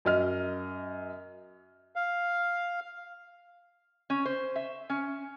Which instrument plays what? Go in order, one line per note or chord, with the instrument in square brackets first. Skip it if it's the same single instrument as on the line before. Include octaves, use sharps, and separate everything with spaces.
[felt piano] F#2 D#5 F6
[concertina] F5
[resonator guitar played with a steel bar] C#4
C5
E5
C#4